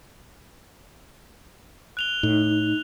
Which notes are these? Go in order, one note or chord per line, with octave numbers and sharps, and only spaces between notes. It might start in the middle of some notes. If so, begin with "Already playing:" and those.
F#6 F7 G7
A2 D#4